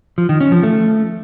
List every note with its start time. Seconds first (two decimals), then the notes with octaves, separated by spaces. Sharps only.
0.18 F3
0.29 D#3
0.41 C#4
0.52 F3
0.63 A3